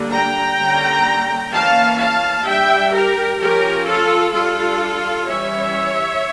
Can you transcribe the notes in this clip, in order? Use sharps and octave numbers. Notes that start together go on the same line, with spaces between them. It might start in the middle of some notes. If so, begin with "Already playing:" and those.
Already playing: D3 G3 A#3 D4
G5 A#5
D3 G3 A#3 C#4
E3 A#3 C#4 F5 A5
F5 A5
G3 D4 E5 G5
G4 A#4
F3 C#4 G4 A#4
F4 A4
G3 D4 F4 A4
E3 G3 C#4 C#5 E5